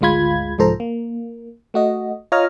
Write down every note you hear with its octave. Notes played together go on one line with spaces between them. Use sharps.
G#1 D2 G#3 F4 B5 G#6
C2 G#2 F3 A4 C5 A#5
A#3
A3 F#4 D#5
F4 C#5 D#5 A#5 D#6 F6